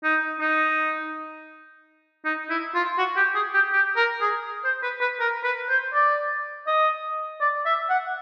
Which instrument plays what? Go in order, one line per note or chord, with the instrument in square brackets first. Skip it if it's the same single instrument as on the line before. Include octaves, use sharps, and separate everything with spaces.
[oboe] D#4
D#4
D#4
E4
F4
F#4
G4
G#4
G4
G4
A#4
G#4
C5
B4
B4
A#4
B4
C5
D5
D#5
D5
E5
F#5